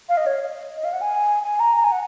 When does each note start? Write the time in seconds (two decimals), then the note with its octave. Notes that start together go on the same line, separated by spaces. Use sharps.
0.09 F5
0.17 D#5
0.26 C#5
0.76 D#5
0.84 F5
0.93 F#5
1.01 G#5
1.43 G#5
1.60 A#5
1.77 A#5
1.84 G#5
1.92 F#5